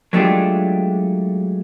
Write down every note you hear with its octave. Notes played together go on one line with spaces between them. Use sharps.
F#3 G#3 A3 D4 F4 G4